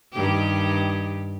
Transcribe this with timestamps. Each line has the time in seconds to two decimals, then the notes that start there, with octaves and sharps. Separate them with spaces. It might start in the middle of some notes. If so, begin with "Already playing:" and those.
0.12 G2 D#3 G4